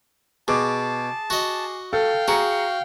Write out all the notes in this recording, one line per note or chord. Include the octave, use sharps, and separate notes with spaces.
B2 G#4 A5 D6
F#4 D#5
A4 F5 G5
F#4 G#4 A#5 C#7